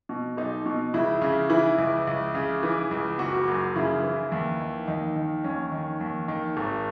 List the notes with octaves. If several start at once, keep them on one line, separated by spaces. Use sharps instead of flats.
B2
B1 D#4
B2
C#2 E4
C#3
E3 E4
C#2
C#2
C#3
E3
C#2
F#1 F#4
F#2
C#3 E4
E3
D#2
D#3
D#2 D#4
D#3
D#2 C#4
D#3
D#2
D#3
G#1